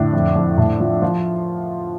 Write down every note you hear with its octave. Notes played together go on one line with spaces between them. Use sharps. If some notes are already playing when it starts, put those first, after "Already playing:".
Already playing: A2 D3 D4
F2
F2
A2
F3
F3 F4